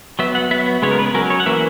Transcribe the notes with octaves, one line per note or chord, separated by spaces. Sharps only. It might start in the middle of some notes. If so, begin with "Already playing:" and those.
F#3 B3 E5
F#5
F#3 B3 E5
C#3 G#3 B3 C#5
A#4
B4
F#3 C#4 A#4
C#5
F#5
E3 A#3 C#4 E5